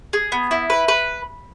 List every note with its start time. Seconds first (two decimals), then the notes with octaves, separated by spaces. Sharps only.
0.13 G#4
0.32 B3
0.51 E4
0.70 B4
0.88 B4